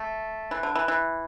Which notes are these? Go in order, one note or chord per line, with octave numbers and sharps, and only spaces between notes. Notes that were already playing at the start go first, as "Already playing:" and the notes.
Already playing: A3
E3
D3
E3
E3